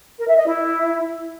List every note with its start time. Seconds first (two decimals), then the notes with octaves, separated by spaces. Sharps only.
0.18 A#4
0.28 E5
0.37 D#5
0.47 E4